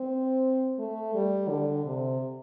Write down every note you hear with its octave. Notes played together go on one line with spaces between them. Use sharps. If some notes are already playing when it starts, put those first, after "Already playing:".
Already playing: C4
A3
G3
D3
C3